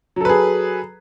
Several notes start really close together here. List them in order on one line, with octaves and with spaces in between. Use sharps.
F#3 A4 B4 G#4